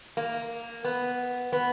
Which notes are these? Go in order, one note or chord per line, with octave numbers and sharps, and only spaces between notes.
A#3
B3
B3